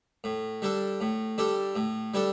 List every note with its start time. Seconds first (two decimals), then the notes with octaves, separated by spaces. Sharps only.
0.24 A2
0.62 G3 D4 A4
1.01 A2
1.38 G3 D4 A4
1.76 A2
2.14 G3 D4 A4